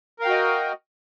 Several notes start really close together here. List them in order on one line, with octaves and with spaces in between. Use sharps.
A#4 F5 G5 F#4 D#5